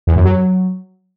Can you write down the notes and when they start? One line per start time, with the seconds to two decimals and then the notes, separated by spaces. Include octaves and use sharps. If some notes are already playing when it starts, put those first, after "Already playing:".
0.07 E2
0.16 F#2
0.25 F#3